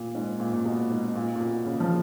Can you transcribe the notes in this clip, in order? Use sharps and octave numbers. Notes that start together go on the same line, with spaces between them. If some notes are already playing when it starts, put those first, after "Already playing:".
Already playing: A#2
G#2
A#2
A#2
B2
G#2
A#2
A#2
B2
C#3
F3